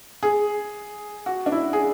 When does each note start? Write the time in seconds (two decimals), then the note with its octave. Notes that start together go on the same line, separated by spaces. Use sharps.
0.23 G#4
1.26 F#4
1.46 D4
1.52 E4
1.73 G#4